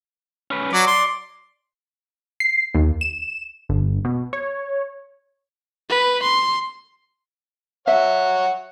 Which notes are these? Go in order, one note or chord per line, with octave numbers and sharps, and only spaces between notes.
C#4 B4
F#3 D5
C6
C7
D#2
E7
G1
B2
C#5
B4
C6
C#5 E5 F#5